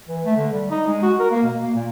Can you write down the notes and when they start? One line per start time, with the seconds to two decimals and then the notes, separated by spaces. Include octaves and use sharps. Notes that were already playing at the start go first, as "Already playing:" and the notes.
0.09 E3
0.25 A3
0.37 D3
0.52 G3
0.70 D#4
0.87 G#3
1.03 F#4
1.19 A#4
1.31 A#3
1.43 B2
1.61 A#3
1.75 A#2